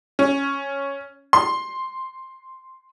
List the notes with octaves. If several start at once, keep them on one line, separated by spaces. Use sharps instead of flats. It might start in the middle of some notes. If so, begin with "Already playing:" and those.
C#4
C6